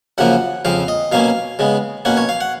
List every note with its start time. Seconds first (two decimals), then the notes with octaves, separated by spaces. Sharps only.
0.18 F#2 C#3 F3 A#3 F#5
0.65 F2 C#3 F3 F5
0.88 D#5
1.12 B2 F#3 A#3 C#4 F5
1.59 C#3 G#3 B3
2.05 B2 A#3 C#4 F#5
2.17 C#5
2.29 F5
2.41 F#5